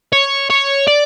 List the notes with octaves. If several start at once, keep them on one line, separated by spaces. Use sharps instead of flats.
C#5
C#5
D5